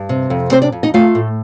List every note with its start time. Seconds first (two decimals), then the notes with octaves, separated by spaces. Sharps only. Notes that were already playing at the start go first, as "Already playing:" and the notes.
Already playing: G2
0.09 C3
0.30 F2
0.51 C3 C4 C5
0.62 D4 D5
0.72 F2
0.83 D#4 D#5
0.94 A3 F4 F5
1.15 A2